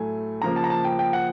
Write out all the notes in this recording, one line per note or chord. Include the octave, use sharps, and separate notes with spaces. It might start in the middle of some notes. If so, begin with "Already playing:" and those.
Already playing: A2 F#3 A3 G#5
C#3 F3 A#3 A#5
A5
A#5
A5
G5
G5
F#5